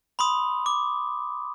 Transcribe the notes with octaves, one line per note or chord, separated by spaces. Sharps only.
B5 C6 D#6
D6